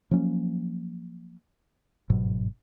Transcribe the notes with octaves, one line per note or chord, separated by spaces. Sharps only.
F3 F#3 A#3 C#4
G1 G#2 B2 F#3